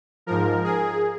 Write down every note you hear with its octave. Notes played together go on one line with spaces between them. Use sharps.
G#2 F3 A#4
G#4